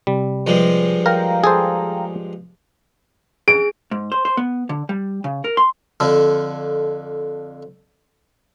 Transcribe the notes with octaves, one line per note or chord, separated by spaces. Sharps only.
C3 G3
G2 F3 G#3
A#4 F5 G5 A#5
G#4 A4 C5
G#4 D7
G#2
C5
C5
B3
D3
G3
C#3
A#4
C6
F2 D3